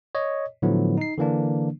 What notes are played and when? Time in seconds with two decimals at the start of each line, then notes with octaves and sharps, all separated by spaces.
0.15 C#5 D#5
0.62 A2 D3 F3 F#3 B3 E4
0.98 D#4 C7
1.18 D3 E3 A#3 D4